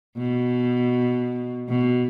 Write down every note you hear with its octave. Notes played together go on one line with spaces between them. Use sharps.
B2
B2